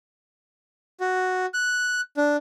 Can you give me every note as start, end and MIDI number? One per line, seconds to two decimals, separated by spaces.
1.00 1.46 66
1.54 2.01 90
2.17 2.36 62